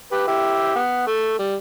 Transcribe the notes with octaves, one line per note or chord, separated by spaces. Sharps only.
G4 B4
E4 G4
B3
A3
G3